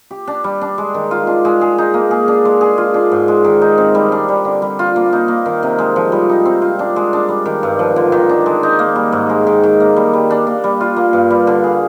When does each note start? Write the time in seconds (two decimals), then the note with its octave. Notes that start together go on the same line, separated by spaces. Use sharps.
0.11 G4
0.27 D4
0.44 G3
0.61 D4
0.78 G#3
0.94 D#3
1.11 F4
1.27 D4
1.45 G#3
1.61 G#4
1.78 D#4
1.94 A#3
2.11 G#4
2.28 D4
2.45 G#3
2.61 G#4
2.78 F4
2.94 D4
3.12 G#2
3.28 G#3
3.44 D#3
3.62 D#4
3.78 C4
3.95 G3
4.12 D4
4.29 G3
4.45 D3
4.62 G3
4.79 F4
4.96 A#3
5.13 D#4
5.28 A#3
5.46 D#3
5.63 C3
5.79 G#3
5.96 F3
6.12 G3
6.29 D#4
6.45 C4
6.62 F4
6.79 D4
6.96 G#3
7.13 D4
7.29 G3
7.46 D#3
7.63 G2
7.79 F3
7.96 D3
8.12 D#3
8.29 D4
8.46 G#3
8.63 D#4
8.79 A#3
8.96 G3
9.12 G#2
9.29 G#3
9.47 D#3
9.64 D#3
9.80 A#3
9.96 G3
10.13 G3
10.31 D4
10.47 A#3
10.64 G3
10.81 F4
10.96 A#3
11.13 G2
11.30 G3
11.47 D3
11.64 G#4